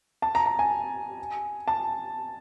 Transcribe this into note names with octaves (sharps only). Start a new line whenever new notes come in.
A5
A#5
A#5
G#5
A5